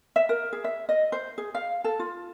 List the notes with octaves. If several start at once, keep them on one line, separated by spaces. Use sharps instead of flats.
E5
A#4
G#4
E5
D#5
C5
G#4
F5
A4
F4